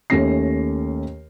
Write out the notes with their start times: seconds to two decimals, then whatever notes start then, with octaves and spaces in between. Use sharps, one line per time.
0.10 D#2 A3 C#4 A#6 C7